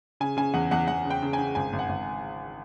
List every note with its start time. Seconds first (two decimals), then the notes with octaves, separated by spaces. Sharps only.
0.20 C#3 G#5
0.37 C#3 G#5
0.54 E2 F#5
0.71 E2 F#5
0.88 E2 F#5
1.05 C#3
1.10 G5
1.22 C#3
1.33 G#5
1.39 C#3
1.55 G#1 G#5
1.73 G#1
1.79 F#5
1.89 G#1